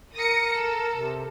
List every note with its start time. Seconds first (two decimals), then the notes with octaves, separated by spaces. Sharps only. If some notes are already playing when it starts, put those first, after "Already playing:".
0.15 A#4 D#6 A#6 C#7
0.52 A4
0.97 C3